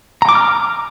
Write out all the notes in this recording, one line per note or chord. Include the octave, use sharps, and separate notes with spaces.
A#5
D6
F6